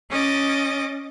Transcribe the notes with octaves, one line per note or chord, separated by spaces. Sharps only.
C#4 D#5 D6 A6